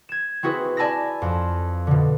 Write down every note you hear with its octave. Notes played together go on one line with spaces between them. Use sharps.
G#6 E7
C4 E4 F#4 G#4 B4
D5 G#5 A5 B5 E6 A#6
F2
B2 D3